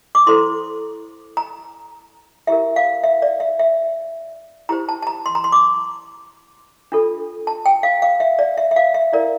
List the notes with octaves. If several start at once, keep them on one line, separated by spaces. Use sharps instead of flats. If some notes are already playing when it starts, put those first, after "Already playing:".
D6
E4 A4 C5 C6
A#5
E4 G4 A#4 E5
F5
E5
D5
E5
E5
E4 G4 C5 A#5
A5
A5
A#5
C6
A#5
C6
D6
D4 F4 A4
A5
G5
F5
F5
E5
D5
E5
E5
F5
E5
E4 A#4 D5